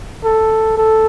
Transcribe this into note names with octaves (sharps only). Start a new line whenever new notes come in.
A4
A4